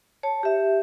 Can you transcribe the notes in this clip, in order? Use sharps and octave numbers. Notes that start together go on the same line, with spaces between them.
C#5 A5
G4 E5